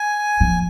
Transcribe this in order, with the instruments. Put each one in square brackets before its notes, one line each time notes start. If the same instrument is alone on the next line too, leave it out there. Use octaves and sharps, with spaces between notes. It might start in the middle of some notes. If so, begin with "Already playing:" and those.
Already playing: [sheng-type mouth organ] G#5
[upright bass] F3